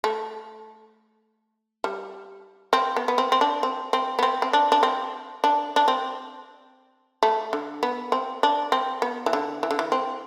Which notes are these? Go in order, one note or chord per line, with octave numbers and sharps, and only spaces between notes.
A3
G3
C4
B3
B3
C4
C4
D4
C4
C4
B3
C4
C4
D4
D4
C4
D4
D4
C4
A3
D3
B3
C4
D4
C4
B3
E3
D3
E3
D3
E3
C4